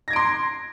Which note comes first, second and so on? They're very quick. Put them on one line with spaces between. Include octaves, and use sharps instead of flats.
A#6 G#6 D7 C6